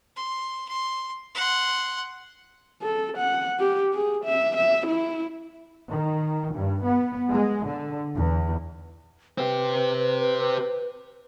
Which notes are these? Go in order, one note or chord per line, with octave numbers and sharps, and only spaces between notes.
C6
C6
F#5 C6
A4
F#5
G4
G#4
E5
E5
E4
D#3
G2
B3
G#3
D3
E2
C4 G4 B4